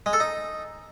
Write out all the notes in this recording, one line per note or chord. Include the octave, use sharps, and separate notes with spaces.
G#3
A4
D#4